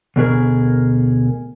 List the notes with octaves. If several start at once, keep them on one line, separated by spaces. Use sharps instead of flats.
D2 B2 G#4 A#4